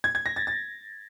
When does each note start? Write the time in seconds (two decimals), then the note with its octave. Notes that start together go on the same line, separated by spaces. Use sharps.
0.04 G#6
0.15 G#6
0.26 A#6
0.36 A6
0.47 A6